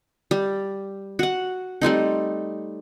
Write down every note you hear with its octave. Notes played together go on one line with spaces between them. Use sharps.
G3
F#4 F#5
G3 A3 C4 D#4